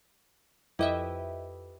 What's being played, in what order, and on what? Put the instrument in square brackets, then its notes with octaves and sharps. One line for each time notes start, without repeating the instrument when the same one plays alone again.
[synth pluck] F2 D#5 E5 [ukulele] E4 G4 B4